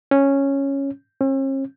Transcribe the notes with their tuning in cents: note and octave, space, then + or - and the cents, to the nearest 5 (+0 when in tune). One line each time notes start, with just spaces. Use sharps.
C#4 -5
C#4 -45